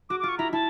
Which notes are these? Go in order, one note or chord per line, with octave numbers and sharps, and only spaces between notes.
F#4 D6
D6
F4
C#6
E4 A#5
E4 A5